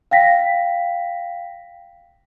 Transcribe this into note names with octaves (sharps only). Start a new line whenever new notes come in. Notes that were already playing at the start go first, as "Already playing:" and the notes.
F5 G5 A#6 B6